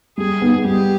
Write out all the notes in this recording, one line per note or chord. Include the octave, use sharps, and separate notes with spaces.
G3 G#4
B3 D#4
G3 G4